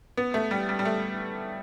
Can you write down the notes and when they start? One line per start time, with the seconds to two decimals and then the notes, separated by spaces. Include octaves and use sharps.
0.17 B3
0.34 A3
0.51 G3
0.69 G3
0.79 G3
0.85 A3